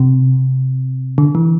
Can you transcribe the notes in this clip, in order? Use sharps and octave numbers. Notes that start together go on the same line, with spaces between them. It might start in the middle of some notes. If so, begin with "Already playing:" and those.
Already playing: C3
D3
E3